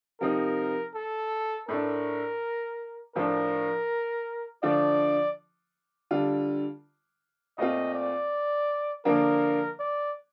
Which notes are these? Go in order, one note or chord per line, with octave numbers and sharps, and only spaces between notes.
C3 F3 C4 D#4 A#4
A4
A2 A3 D4 A#4
A2 F3 A3 D4 A#4
D3 F3 A3 D4 F4 D5
D3 G3 D4 F4
A#2 A3 C4 F4 D#5
D5
D3 F3 A#3 D4 A#4
D5